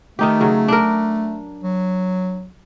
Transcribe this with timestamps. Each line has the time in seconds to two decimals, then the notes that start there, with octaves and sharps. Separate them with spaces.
0.19 D#3 A3 D#4 G4
0.40 C#3 F#3
0.68 D4 A#4
1.63 F#3